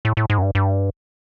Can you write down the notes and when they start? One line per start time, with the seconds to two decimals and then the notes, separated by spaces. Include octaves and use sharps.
0.05 A2
0.17 A2
0.30 G#2
0.38 F#2
0.42 G2
0.55 G2